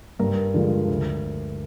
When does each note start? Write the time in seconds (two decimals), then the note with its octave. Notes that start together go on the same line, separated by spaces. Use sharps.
0.19 G2 A#4
0.54 D3 F3 G#3
0.88 D2